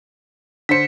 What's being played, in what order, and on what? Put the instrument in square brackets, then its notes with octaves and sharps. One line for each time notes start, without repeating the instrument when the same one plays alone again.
[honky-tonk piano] D3 C5 [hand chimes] B6 C#7